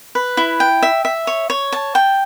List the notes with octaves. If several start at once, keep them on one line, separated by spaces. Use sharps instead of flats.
B4
E4
G5
E5
E5
C#5
C#5
A5
G5